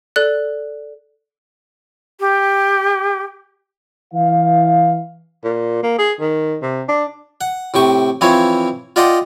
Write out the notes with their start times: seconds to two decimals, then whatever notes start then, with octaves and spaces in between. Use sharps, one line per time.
0.16 A4 D5 F#6
2.20 G4
4.14 E3 F5
5.44 A#2
5.83 A#3
5.99 G#4
6.20 D#3
6.62 C3
6.89 D4
7.41 F#5
7.74 A2 C3 G5 C#6
8.21 E3 F3 C4 E4 C#5
8.96 F4 D5 D#5 F#5 G5 C6